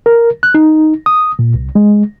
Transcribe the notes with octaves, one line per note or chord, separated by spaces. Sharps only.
A#4
F#6
D#4
D#6
A#2
C2
G#3